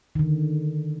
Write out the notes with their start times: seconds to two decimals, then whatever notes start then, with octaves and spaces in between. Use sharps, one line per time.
0.15 D#3
0.19 D3